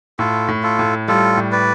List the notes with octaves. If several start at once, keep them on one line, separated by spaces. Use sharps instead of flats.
A2 F4 A4
A2
F4 A4
A2
G3 F4 A4
A2
B4 D5